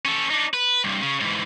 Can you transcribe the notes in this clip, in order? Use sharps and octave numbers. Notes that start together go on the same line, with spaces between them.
C#4 A4
D4 D#4
B4
C2 G2
C#3
G#2 E3